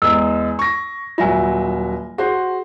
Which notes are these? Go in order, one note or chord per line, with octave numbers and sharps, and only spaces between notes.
E2 G#3 E6
C#6 A#6
D#1 F#3 F4 E5 G#5
F#4 G#4 C5